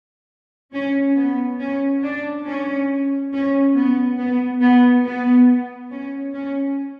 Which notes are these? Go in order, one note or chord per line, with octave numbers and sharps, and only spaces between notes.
C#4
B3
C#4
D4
C#4
C#4
B3
B3
B3
B3
C#4
C#4